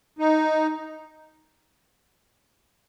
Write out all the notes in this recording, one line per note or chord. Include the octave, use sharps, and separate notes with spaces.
D#4